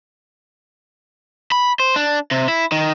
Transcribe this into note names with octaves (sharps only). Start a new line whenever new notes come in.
B5
C5
D4
C3
E4
D#3